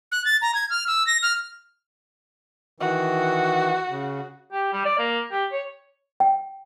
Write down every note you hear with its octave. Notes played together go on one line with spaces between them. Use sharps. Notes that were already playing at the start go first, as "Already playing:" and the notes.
F#6
A6
A#5
G#6
F6
E6
A#6
F6
D#3 E3 F#4
C#3
G4
G3
D5
A#3
G4
C#5
G5